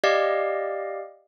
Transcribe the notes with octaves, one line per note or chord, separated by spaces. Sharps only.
G4 D5 D#5 F5